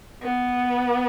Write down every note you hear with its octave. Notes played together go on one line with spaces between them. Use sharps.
B3